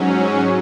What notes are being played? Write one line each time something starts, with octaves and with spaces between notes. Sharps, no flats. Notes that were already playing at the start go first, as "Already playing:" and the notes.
Already playing: G#2 F#3 C#4